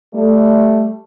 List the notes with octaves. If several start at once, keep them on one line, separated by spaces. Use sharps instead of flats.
G3 A3